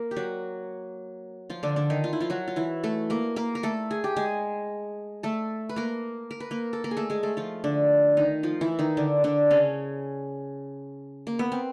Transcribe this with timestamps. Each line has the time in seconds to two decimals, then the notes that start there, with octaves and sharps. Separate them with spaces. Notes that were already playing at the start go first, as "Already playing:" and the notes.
Already playing: A#3 A#4
0.11 G4
0.16 F#3 F#4
1.50 F3 F4
1.63 D3 D4
1.76 D3 D4
1.90 D#3 D#4
2.04 F4
2.13 E4
2.20 F3 F4
2.30 F#3 F#4
2.48 F4
2.56 E3 E4
2.83 A3 A4
3.10 A#3 A#4
3.36 A#3 A#4
3.55 A#4
3.63 A3 A4
3.91 G#4
4.04 G4
4.16 G#3 G#4
5.23 A3 A4
5.69 B4
5.76 A#3 A#4
6.31 A#4
6.40 B4
6.51 A#3 A#4
6.73 A4
6.84 A#3 A#4
6.91 G#4
6.97 A3 A4
7.10 G#3 G#4
7.23 A3 A4
7.37 F3 F4
7.64 D3 D4
8.17 D#3 D#4
8.43 F3 F4
8.61 E3 E4
8.79 D#3 D#4
8.97 D3 D4
9.24 D3 D4
9.51 C#3 C#4
11.27 A#3
11.39 B3
11.52 C4